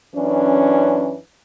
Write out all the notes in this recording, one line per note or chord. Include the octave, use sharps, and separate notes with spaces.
F#2 E3 C#4 D4